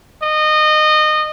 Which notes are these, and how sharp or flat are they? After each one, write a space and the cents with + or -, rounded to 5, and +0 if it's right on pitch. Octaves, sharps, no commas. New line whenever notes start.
D#5 -25